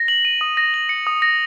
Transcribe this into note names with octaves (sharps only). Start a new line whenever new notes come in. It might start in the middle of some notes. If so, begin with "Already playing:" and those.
Already playing: A#6
F#7
D#7
D#6
A#6
F#7
C#7
D#6
A#6